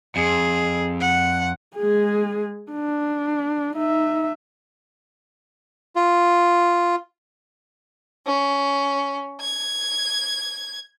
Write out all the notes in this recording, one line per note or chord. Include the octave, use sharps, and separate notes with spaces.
F2 G#4
F#5
G#3 G#4
D4
D#4 E5
F4
C#4
G#6